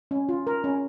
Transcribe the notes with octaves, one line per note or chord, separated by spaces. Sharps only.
C#4
F4
A#4
C#4